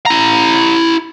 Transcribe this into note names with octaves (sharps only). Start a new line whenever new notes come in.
E4 A#5